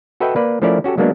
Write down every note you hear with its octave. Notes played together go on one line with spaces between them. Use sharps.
F#4 A4 B4 D#5 E5 G5
A#3 B4 D5
F3 A3 C#4 E4 A#4 D5
C#4 F#4 G4 A4
F#3 G#3 A#3 B3 D4 F#4